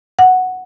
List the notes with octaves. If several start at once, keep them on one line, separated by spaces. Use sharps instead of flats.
F#5